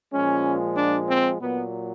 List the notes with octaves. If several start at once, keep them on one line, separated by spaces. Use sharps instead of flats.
A#2 F3 G#3 C#4
D4
C4
A#2 F#3 B3